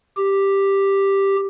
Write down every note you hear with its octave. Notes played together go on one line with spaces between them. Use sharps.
G4